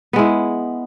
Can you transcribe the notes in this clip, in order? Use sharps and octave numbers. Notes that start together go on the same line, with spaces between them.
G#3 B3 E4